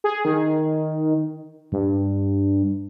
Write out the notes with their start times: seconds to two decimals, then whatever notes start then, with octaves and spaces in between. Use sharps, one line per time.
0.04 G#4
0.25 D#3
1.72 G2